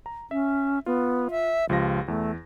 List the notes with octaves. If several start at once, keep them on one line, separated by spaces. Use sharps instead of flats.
A#5
C#4 E5
B3 F4
E5
C#2 F3 G4 A#6
E2 A3